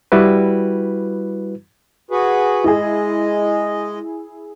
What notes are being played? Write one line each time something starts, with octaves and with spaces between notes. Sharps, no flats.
G3 E4 F#4 B4
F#4 G#4 B4
G#3 E4 G#4 D#5